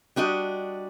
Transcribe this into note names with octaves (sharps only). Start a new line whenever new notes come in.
G3 D4 F#4 D#5